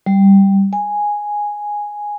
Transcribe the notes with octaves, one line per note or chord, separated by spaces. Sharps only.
G3
G#5